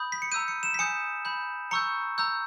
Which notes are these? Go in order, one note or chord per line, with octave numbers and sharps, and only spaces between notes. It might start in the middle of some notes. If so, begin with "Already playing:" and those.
Already playing: B5 D#6 G6
B6
C#7
A#5 E6 G6 D#7
C#7
E7
B6
G#5 D#6 G6 C#7
B5 G6
A#5 C#6 E6 G6 C#7
A#5 E6 G6